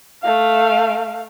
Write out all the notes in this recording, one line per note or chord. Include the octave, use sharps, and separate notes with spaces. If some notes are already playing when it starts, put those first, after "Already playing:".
A3 F5